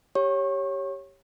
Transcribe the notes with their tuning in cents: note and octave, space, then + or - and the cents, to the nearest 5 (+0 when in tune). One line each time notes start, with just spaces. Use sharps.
G4 +0 C#5 -5 C#6 -30